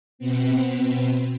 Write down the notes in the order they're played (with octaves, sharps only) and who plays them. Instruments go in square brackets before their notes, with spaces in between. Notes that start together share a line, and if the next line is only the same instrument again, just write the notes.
[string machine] B2 B3 C4